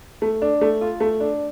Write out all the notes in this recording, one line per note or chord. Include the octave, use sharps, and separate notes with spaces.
A3
D4
A3
F4
A3
D4